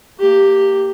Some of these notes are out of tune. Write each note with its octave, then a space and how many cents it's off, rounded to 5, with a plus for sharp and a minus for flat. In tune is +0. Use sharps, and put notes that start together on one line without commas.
A#3 -20 G4 +0